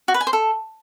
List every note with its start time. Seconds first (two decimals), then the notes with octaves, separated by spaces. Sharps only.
0.08 F#4
0.14 B4
0.21 G#5
0.27 C5
0.33 A4